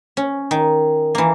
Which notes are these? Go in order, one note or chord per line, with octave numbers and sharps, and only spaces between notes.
C#4
D#3
E3 A#3